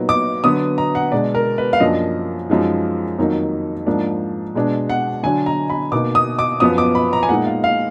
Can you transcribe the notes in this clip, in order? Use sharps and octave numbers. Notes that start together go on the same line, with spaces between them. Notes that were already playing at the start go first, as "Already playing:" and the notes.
Already playing: A#2 F#3 B3 D#4
D6
D3 F#3 B3 D#6
A#5
F#5
B2 G#3 D4 D5
A#4
B4
F5
F#2 F3 A#3 D4 D#5
F#2 F3 G#3 D#4
F2 D#3 F#3 A#3 D#4
G#2 F3 A#3 D4
B2 G#3 D4
F#5
D3 F#3 D4 G#5
A#5
B5
B2 A#3 D#4 D6
D#6
D6
F#2 F3 B3 D#6
D6
B5
A#5
G#5
A#2 G#3 D#4 F#5
F5
F5